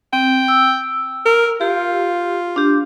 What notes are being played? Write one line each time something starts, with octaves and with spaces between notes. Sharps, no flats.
C4 G5
E6
A#4
F4 G4
D4 G4